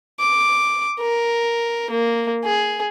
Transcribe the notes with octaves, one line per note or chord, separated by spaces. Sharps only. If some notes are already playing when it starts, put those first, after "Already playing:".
D6
A#4
A#3
G#4